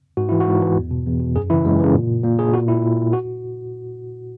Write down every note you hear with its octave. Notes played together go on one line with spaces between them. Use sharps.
G#2 F#4
E3 E4
F#4
G#2
E3
E2
B2
E2
B2
F#2 G#4
C#3 E3 E4
F#2 G#3
C#3 E3
A#2
A#2 A#3
G#4
A#2 F#4
E4
A#2
F#4